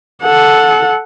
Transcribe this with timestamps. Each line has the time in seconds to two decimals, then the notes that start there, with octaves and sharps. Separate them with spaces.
0.23 A4 F#5